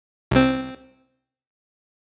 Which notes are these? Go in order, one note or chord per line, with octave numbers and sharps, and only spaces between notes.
C2 C4